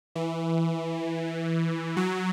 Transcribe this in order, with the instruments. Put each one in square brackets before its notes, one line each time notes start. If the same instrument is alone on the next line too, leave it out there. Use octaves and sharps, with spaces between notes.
[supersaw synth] E3
F#3